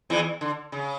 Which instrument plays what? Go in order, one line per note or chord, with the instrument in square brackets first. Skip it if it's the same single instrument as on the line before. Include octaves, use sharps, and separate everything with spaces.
[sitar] E2 E3
D3
C#3